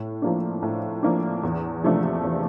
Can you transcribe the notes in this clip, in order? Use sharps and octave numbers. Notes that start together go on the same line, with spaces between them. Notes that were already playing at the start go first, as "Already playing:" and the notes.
Already playing: A2
F3 A#3 D4
A2
F3 A#3 D4
E2
C3 F3 A3 D4
E2